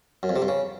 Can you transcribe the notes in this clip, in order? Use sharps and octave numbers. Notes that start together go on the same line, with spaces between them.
F#2
F2
C3
G2
C#3